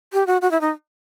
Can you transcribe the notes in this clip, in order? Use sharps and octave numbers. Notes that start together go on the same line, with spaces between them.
G4
F#4
F#4
E4
D#4